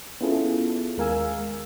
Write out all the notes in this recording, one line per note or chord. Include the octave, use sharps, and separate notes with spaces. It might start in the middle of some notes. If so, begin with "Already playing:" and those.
B3 C#4 E4 F4 G#4 A4
D#2 G#3 A#4 F5 G#5 E6